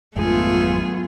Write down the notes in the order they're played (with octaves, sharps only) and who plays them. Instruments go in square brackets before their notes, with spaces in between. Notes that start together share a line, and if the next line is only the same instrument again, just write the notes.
[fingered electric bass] G#1 F2 G#3 [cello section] F#3 B3 F4 [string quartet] A3 G#4